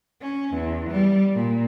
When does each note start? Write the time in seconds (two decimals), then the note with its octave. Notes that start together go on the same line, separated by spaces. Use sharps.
0.21 C#4
0.55 E2
0.90 G3
1.35 A#2